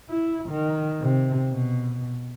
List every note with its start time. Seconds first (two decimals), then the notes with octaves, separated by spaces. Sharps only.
0.10 E4
0.49 D#3
1.01 C3
1.50 B2